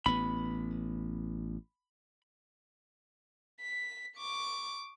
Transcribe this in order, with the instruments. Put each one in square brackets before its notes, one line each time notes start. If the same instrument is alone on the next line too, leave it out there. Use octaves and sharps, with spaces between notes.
[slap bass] A1 B3 [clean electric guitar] B5
[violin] B6
C#6 D6